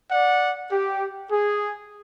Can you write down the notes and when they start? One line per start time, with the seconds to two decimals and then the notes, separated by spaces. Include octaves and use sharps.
0.10 D5 F#5
0.70 G4
1.29 G#4